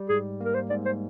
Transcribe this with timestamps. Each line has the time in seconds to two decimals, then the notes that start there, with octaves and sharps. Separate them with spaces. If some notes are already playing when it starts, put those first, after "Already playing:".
Already playing: G3
0.09 G#2 G#4
0.40 A#3 A#4
0.55 C5
0.70 G#2 D5
0.86 C5